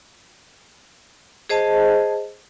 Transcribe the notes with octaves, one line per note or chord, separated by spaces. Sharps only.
G#4 C5 D#5 A5